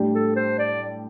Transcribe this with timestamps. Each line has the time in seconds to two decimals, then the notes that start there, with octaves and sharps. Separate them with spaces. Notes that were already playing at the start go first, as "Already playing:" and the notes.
Already playing: A2 G3 D4 G4
0.15 A4
0.36 C5
0.59 D5